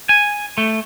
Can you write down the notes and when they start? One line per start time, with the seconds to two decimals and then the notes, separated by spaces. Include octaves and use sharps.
0.09 G#5
0.58 A3